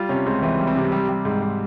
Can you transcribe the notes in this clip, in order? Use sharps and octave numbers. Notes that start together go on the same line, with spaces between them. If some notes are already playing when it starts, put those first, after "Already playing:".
Already playing: G3 F4
C3 C#4
C#2 C4
E3 C4
G3
C4
C3
G3
G3
G#2
G#2